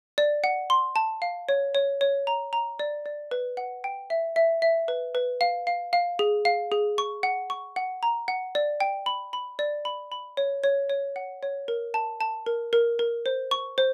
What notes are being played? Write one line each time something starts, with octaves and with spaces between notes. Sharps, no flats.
D5
F#5
C6
A5
F5
C#5
C#5
C#5
A#5
A#5
D5
D5
B4
F#5
G5
E5
E5
E5
B4
B4
F5
F5
F5
G#4
F5
G#4
C#6
F#5
C#6
F#5
A#5
F#5
D5
G5
B5
B5
D5
B5
B5
C#5
C#5
C#5
F#5
C#5
A#4
A5
A5
A#4
A#4
A#4
C5
C#6
C5